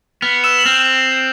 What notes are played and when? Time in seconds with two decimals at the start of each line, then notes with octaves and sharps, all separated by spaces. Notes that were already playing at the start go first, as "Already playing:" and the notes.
0.22 B3 F6 F7
0.44 E6 E7
0.59 F#7
0.65 C4 F6 F7